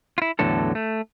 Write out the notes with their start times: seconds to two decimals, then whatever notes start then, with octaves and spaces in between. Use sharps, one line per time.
0.18 E4 F4
0.39 E2 A2 D3 F#3 A4
0.75 A3